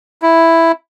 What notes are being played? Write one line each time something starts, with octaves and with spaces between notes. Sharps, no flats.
E4